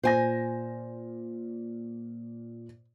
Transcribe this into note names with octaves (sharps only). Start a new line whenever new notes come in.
A#2 C5 G#5 A#6